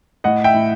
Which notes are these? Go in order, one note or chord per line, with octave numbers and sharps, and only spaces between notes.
A2 D#5 F#5
E5 G5
A2